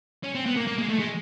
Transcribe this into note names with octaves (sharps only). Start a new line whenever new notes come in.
C#4
C4
B3
A#3
A#3
G#3
A3
G#3